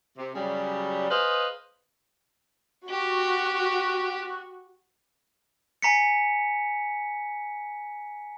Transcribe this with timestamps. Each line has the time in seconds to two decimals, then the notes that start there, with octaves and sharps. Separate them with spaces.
0.18 C3
0.35 C#3 F#3 G3
1.09 G#4 B4 C5 D#5 F5
2.90 F#4 G4
5.82 G#5 A#5 B6 C#7